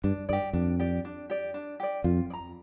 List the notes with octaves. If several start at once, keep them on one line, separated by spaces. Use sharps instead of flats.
G2 D4
G2 G4 D5
F2 D4
G4 D5
D4
G4 D5
D4
G4 D5
F2 F4
D5
A#5